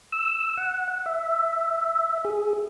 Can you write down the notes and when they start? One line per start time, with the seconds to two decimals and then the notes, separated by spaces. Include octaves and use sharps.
0.12 E6
0.57 F#5
1.06 E5
2.25 G#4